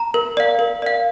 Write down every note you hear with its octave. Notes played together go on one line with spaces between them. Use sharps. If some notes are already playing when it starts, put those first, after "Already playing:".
Already playing: A#5
A#4
D5 F5
A#4
D5 F5